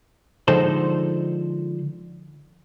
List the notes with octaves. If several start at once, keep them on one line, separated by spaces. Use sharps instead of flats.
D3 F3 G#3 D#4 A4 C5